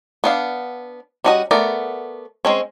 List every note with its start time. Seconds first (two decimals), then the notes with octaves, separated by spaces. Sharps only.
0.24 B3 D4 F5
1.24 G3 C#4 F#4 D5 D#5
1.51 A3 B3 A#4 D5
2.45 G#3 C4 C#4